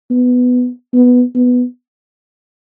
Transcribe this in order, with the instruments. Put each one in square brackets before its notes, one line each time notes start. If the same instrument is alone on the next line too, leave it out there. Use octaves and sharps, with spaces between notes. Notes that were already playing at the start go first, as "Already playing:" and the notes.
[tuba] B3
B3
B3